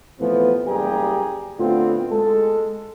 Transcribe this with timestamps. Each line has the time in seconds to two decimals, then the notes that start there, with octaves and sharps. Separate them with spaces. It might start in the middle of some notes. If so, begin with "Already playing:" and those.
0.19 A2 C3 E3 F3 B3
0.67 F#1 G3 G4 G#4 G5 A#5
1.59 A2 D3 B3 C4 F4
2.10 G#3 A4